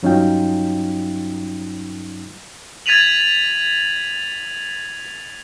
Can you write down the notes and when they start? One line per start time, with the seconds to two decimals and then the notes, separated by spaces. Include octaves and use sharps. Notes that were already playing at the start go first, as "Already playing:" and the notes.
0.03 G2 F#3 C#4 D#4 F4 G5
2.86 G#6 A6 B6 D#7 F7 F#7